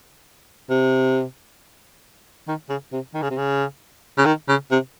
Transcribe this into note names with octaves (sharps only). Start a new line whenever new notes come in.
C3
D#3
C#3
C3
D#3
C#3
C3
C#3
C#3
D#3
C#3
C3